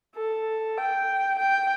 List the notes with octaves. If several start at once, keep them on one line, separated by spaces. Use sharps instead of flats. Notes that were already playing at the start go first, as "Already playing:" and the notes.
A4
G5
G5